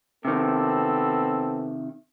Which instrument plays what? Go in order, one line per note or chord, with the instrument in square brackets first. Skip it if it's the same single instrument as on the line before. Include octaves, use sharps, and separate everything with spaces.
[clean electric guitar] C3 D#3 [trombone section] B3 C4 A4